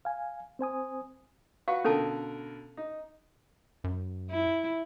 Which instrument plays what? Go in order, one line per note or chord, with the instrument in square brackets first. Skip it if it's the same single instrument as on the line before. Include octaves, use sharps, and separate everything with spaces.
[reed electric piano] F5 G#5
C4 C5 G#5 D#6
[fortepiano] F#4 B4 C#6 [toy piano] F5
[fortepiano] B2 D3 A#4 [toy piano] C#4 A4 A5
[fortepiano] D#4
[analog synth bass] F#2
[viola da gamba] E4